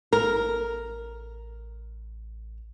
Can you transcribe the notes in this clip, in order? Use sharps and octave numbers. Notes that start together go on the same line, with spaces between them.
A1 A#4